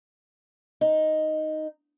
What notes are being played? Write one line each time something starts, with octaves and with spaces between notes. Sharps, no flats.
D#4